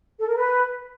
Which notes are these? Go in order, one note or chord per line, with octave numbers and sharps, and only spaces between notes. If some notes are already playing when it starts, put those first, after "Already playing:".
A4
A#4
B4